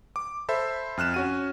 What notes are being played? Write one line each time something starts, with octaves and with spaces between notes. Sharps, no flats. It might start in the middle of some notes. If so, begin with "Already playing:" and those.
D6
A4 C5 E5 B5
F2 F6 F#6 E7
C#4 F#4 D#7